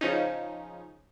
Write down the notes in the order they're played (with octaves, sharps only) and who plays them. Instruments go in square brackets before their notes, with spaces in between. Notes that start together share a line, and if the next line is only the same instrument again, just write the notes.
[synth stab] C#3 F3 C#4 D#4